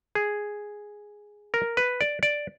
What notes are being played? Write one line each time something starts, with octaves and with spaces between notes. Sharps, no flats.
G#4
A#4
B4
D5
D5